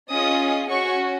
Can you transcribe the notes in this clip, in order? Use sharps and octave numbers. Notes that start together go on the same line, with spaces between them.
C#4 F4 G#4 D#5 D#6
C#4 F#4 C#5 C#6